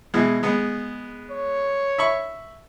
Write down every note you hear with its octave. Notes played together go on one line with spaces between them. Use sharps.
B2 E3 G#3
G#3 B3
C#5
E5 B5 C#6